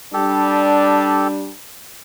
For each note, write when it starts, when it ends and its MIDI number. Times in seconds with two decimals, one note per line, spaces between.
0.14 1.51 55
0.14 1.51 62
0.14 1.28 67
0.14 1.28 69